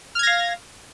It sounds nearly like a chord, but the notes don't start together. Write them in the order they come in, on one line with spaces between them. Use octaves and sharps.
F6 G#6 A#6 F5